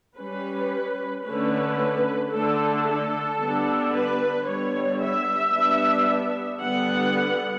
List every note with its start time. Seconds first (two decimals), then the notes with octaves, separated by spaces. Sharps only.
0.17 G3 C#4 B4
1.25 D3 A3 C#4 B4
2.32 D3 A3 D4 A4
2.86 A4
3.40 D3 G3 B3 D4
3.93 B4
4.47 D3 G3 B3 C#5
5.01 E5
5.54 G3 B3 D4
6.61 D3 G3 B3 F#5